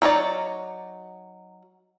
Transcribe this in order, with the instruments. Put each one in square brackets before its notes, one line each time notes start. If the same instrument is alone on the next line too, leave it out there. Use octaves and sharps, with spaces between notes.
[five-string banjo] F#3 D#4 C#5 D5